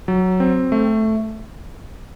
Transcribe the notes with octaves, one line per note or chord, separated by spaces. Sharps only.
F#3
C4
A3